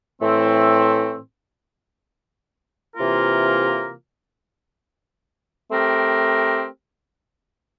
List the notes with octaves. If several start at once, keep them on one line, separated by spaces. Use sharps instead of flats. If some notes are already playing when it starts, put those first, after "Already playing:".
A2 E3 A3 C4
C3 E3 A#3 F4 A#4
A3 C4 G4 A#4